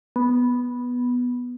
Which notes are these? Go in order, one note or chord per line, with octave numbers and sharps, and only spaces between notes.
B3